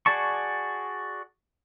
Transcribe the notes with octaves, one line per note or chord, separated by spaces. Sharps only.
F#4 G#4 D5 A5 C#6